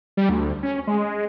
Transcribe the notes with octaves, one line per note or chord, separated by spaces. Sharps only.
G3
D2
C#4
G#3